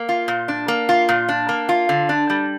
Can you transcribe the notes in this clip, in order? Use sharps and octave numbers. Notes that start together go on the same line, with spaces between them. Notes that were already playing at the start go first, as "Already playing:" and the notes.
Already playing: A#3
F4
A#2
D4
A#3
F4
A#2
D4
A#3
F4
D3
D4
G3